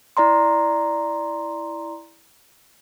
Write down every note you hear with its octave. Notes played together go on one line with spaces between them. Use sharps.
E4 D5 A#5 C6